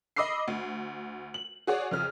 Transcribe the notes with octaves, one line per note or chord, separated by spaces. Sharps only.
D#5 B5 D6 E6 C7
D2
F#7
F#4 G#4 C#5 D5
F2 C#3 F6